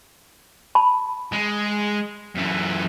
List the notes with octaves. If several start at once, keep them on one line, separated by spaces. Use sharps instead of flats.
A5 B5
G#3
F#2 E3